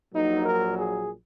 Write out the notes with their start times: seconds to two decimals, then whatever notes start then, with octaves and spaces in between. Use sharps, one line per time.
0.14 A#1 A#2 F#3 D#4
0.46 A#4
0.77 G#4